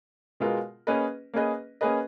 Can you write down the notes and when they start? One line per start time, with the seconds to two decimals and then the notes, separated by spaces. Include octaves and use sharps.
0.40 B2 G#3 B3 F4 A#4
0.87 A#3 C#4 G#4 B4 D#5
1.34 A#3 C#4 G#4 B4 D#5
1.81 A#3 C#4 G#4 B4 D#5